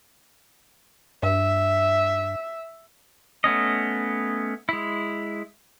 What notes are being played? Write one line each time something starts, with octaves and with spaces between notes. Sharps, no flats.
G2 E5
A3 B3 C#4 D#5
G#3 E4